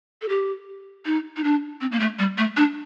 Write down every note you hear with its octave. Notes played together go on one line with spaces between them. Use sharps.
A4
G4
D#4
D#4
D4
C4
A#3
A3
G3
A3
D4